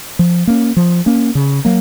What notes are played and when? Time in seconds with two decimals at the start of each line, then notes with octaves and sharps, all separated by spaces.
0.19 F3
0.47 A#3 C#4
0.77 F3
1.06 A#3 C#4
1.35 C#3
1.65 F#3 A#3